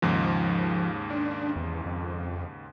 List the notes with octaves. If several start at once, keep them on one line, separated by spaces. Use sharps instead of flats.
D#2 G#2 C#3 F3
D4
E2
F2